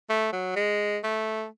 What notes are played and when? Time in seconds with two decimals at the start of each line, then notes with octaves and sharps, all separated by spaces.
0.10 A3
0.33 F#3
0.56 G#3
1.04 A3